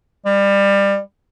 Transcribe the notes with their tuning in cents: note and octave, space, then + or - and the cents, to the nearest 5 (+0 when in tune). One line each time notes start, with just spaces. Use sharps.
G3 +25